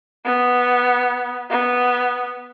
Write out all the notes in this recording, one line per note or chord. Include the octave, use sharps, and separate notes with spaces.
B3
B3